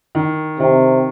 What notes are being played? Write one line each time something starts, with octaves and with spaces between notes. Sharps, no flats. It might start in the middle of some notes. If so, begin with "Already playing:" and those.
D#3
C3 D#3